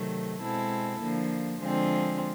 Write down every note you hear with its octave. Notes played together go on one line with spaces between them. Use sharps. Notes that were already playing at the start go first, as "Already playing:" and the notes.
Already playing: C3 D#3 F#3 A3
B2 G#3 C4 E4 A4
D3 F3 A#3
D3 F3 G#3 C4 F4